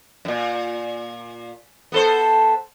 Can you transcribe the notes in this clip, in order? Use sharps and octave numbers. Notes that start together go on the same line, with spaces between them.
F#2 A#2
B3 A4 C5